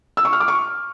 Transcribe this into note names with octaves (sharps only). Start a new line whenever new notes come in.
E6
C#6
F6
D6
C#6